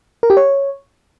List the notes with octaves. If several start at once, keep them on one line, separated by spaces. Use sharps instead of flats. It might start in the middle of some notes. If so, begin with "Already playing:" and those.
A#4
G4
C#5